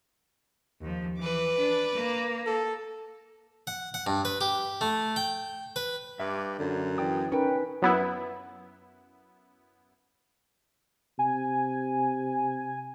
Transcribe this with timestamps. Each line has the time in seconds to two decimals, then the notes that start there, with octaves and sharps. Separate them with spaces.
0.81 D#2 F3
1.19 E3 B4 D6
1.58 D4
1.95 A#3
2.46 A4
3.67 F#5
3.94 F#5
4.07 G2
4.25 B4
4.41 G4
4.81 A3
5.16 G5
5.76 B4
6.20 G2 E5 D6
6.59 F#2 D3
6.98 E3 D5 G5 D#6
7.32 C#4 D#4 A#4 B4 G5 C#6
7.82 F#2 B3 E4
11.19 C3 G#5